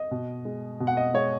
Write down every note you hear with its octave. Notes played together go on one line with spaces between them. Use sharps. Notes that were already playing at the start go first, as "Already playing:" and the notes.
Already playing: D#5
B2
G#3
B2
F#5
D#5
G#3 C#5